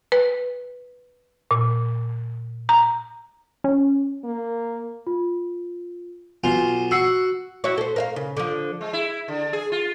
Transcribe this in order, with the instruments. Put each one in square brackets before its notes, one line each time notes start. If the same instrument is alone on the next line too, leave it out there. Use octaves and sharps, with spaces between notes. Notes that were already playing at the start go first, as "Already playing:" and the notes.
[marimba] B4
A#2
A#5
[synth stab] C#4
[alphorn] A#3
[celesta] F4
[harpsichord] B1 F4 [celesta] G#5
[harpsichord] F#4 [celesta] F#5 E6 C7
[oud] E4 F#4 C#5
A4 C5
A#4 E5 F5
C#3
D3 F3
[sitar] G#3
E4
D3
G#4
F4